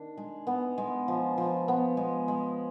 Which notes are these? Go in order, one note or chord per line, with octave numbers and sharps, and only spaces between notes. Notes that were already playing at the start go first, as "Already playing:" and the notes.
Already playing: D#3 D4
G#3
B3
G#3
F3
F3
B3
G#3
G#3